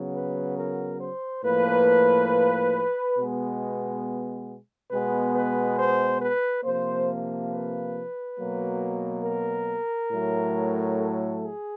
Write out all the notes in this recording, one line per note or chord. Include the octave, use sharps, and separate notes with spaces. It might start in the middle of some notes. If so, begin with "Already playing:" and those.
Already playing: C#3 F#3 B3
B4
A#4
C5
A2 F3 A#3 B4
B2 G#3 B3
B2 G#3 B3 B4
B4
C5
B4
C3 F3 A#3 C5
B4
B2 F#3 A#3
A#4
A2 F#3 A3
A4
G#4